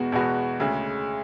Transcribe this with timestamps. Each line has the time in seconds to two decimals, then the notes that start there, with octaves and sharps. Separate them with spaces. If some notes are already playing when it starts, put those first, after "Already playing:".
Already playing: E2 B2 G#3 B3 F#4
0.12 E2 B2 G#3 B3 F#4
0.60 D2 C#3 G#3